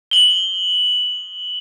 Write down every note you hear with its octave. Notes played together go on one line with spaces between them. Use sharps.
F#7 G7